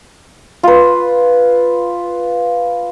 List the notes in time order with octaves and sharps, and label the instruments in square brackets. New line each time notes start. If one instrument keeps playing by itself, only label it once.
[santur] F4 B4